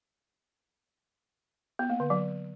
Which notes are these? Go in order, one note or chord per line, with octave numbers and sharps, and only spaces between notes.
B3
A#3
D3
F#3